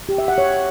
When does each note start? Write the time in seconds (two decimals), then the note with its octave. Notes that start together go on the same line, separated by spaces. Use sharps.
0.09 G4
0.18 E5
0.28 F#5
0.38 C#5